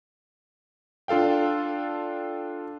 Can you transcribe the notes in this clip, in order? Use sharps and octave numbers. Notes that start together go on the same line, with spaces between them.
D4 F4 A4 F5 G5